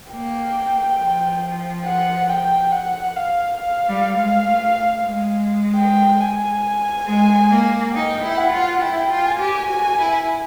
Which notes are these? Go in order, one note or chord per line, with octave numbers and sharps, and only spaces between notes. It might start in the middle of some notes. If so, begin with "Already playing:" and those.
A#3 G5
F3
F#5
G5
F#5
F5
F5
G3
G#3
A3
G#3
G5
G#5
G#3
A#3
D#4 G5
E4
F#5
F4
E4 G5
F4
G#5
G4
F#4
E4